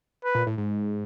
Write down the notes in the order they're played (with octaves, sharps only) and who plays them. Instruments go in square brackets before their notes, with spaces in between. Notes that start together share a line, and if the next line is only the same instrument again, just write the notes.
[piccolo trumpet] B4
[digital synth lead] A#2
A2
G#2